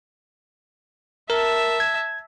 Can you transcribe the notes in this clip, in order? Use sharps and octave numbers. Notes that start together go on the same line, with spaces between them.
A#4 E5 A5
G#6